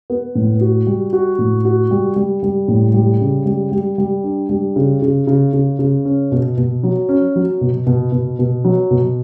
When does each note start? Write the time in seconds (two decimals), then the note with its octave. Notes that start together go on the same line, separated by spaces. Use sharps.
0.10 B3
0.35 A2
0.61 F#4
0.87 G3
1.13 F#4
1.39 A2
1.65 F#4
1.91 G3
2.16 G3
2.43 G3
2.68 A2
2.94 G3
3.21 C#3
3.46 G3
3.72 G3
3.98 G3
4.24 D4
4.49 G3
4.76 C#3
5.02 C#3
5.27 C#3
5.53 C#3
5.79 C#3
6.05 C#4
6.32 B2
6.57 B2
6.83 F#3
7.09 C#4
7.36 F#3
7.61 B2
7.87 B2
8.12 B2
8.39 B2
8.64 F#3
8.91 B2